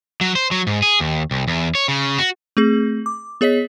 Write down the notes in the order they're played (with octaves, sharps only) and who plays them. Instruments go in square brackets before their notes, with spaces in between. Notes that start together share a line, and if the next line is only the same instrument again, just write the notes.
[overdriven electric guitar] F#3
C5
F#3
G#2
G#4
D#2
C2
E2
C#5
C#3
F#4
[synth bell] A3 C4 G#4
D6
B3 G#4 C#5 D#5 B6